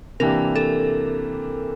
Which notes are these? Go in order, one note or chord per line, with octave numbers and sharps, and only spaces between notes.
C3 E3 A#3 D4 G4 A#4
A4